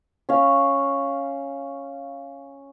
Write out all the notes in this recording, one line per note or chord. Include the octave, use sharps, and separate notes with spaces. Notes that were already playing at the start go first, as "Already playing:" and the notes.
C#4 F5